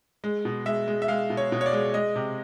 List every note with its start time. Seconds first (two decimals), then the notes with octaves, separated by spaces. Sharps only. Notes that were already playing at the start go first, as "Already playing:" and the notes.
0.24 G#3
0.45 B2
0.66 G#3 E5
0.88 G#3
1.02 E5
1.08 G#3 F5
1.30 B2
1.37 C#5
1.52 B2
1.61 C#5
1.66 D5
1.73 G#3
1.94 G#3 D#5
2.16 C3